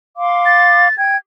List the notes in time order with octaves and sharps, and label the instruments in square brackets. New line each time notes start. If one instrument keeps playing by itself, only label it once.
[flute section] F5 C6 D6
[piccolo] A6
[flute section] G5 G#6